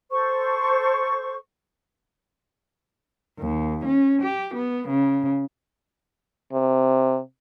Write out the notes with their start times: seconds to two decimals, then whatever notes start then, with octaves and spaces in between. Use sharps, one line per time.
0.11 A4 C5 C#6
3.39 D#2
3.85 C#4
4.22 G4
4.55 B3
4.88 C#3
6.53 C3